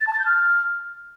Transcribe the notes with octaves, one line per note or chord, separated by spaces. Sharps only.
A6
A5
A6
G6
F6